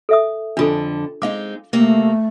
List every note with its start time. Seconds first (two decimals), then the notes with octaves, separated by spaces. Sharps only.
0.09 A4 E5 D#6
0.57 F2 D3 D4 F4 A4
1.22 G#3 C4 D#4 F5 D6
1.73 C3 A3 A#3